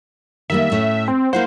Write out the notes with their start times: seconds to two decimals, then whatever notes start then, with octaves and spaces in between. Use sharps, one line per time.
0.50 D#3 G3 A#3 E5
0.72 A2 C#4
1.08 C4
1.33 A#3 E4 C5 F#5